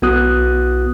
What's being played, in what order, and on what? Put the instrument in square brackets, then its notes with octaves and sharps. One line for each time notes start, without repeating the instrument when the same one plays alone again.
[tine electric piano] B1 B3 E4 F#4 D#6 F#6